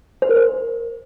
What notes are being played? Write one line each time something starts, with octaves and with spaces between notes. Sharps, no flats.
C5
A#4
C5